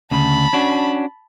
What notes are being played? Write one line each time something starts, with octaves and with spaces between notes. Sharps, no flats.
D2 C#3 A5 B5
C#4 D4 F#4